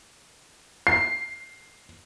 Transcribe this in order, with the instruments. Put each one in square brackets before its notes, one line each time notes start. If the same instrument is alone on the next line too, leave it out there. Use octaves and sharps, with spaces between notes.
[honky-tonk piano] C7